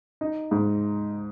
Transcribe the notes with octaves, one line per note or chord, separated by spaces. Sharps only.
D#4
G#2